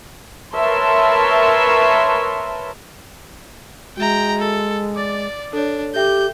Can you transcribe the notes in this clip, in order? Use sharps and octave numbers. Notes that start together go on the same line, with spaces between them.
A#4 B4 C#5 E5 A5 C6
G#3 F#4 E5 G5 A#5
A4
D5 D6 A6
D4 A4 C#5
G4 A4 E5 G5 G6